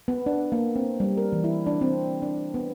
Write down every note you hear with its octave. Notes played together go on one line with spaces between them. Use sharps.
B3
D4
A#3
C4
G3
A#4
E3
E4
D4
C4
D4
B3